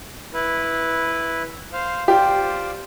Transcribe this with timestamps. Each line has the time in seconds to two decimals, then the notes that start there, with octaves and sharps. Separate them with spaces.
0.34 E4 B4
1.73 C5 F5
2.08 F4 G4 C5 D5